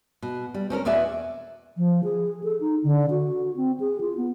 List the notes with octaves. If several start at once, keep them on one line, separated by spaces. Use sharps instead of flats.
B2
G3
C4 C#4 A4 A#4
E2 B2 F#4 D5 E5 G#5
F3
G#4
A4
D#4
D3
F#4
C4
G#4
F4
B3